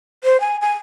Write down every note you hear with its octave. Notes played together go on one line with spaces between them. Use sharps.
C5
G#5
G#5